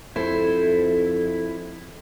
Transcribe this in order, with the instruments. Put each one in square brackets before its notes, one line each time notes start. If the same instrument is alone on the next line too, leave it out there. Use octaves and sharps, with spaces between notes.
[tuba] F2 [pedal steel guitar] E4 [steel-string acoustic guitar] A4 C5